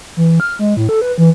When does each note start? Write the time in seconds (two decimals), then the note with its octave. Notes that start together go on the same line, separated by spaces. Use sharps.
0.17 E3
0.40 F6
0.59 G#3
0.77 A2
0.89 A4
1.01 B4
1.18 E3